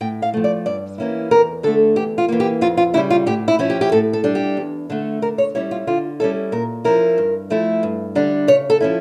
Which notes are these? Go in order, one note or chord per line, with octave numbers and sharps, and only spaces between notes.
A2 G5
F5
F3 A3
D5
G2 D5
E3 A#3 C#4 E4
E2 A#4
D3 A3 A4
E2 G4
F4
E3 A#3
G4
F2 F4
F4
C#3 G3 E4
F4
A2 G4
E4
F3 C#4 E4
G4
G4
A2 A4
A4
G3 D4
G4
E2
D3 A3
D3 A#4
C#5
G3 C#4 E4 C#5
F4
D3 F4
G3 C#4 E4 A4
A#2 A#4
F3 C#4 E4 A#4
G2
F3 A3 E4
G2
D3 G3 D4
C#3 C#5
A4
F3 C#4 E4